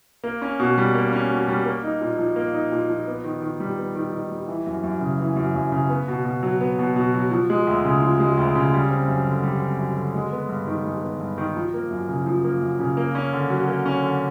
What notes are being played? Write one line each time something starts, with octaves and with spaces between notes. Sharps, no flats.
A#3
C#4
B2
G3
A#3
C#4
B2
G3
A#3
D#4
A#2
F3
A#3
D#4
A#2
F3
B3
D#3
D#3
G3
B3
D#3
D#3
G3
E3
F#2
F#2
C#3
E3
F#2
F#2
C#3
B3
B2
B2
F#3
B3
B2
B2
F#3
F3
G#3
D2
C#3
F3
G#3
D2
C#3
G3
C4
F#2
D3
G3
C4
F#2
D3
G#3
B3
G2
D#3
G#3
B3
G2
D#3
F3
A#3
F#2
C#3
F3
A#3
F#2
C#3
A#3
C#4
D3
F#3
A#3
C#4
D3